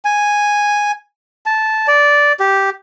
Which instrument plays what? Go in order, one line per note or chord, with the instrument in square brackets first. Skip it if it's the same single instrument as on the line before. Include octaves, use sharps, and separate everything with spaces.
[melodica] G#5
A5
D5
G4